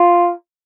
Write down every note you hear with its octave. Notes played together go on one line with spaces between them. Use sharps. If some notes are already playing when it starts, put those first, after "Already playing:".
Already playing: F4